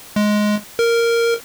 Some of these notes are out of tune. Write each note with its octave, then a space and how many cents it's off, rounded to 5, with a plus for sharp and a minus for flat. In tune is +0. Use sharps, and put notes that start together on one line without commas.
G#3 +10
A#4 -5